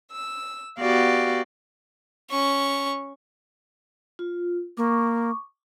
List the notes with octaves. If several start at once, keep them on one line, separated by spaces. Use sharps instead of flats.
E6
B3 F#4 G4 D5 F5
C#4 C#6
F4
A#3 C#6 D6